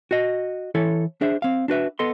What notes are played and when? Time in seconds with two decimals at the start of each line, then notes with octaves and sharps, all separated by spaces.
0.11 F#4 D#5
0.75 E3 E4 A4 C#5
1.21 D4 G#4 C5 E5
1.42 C4 F5
1.68 D4 F#4 B4 E5
1.99 B3 A4 D#5 C6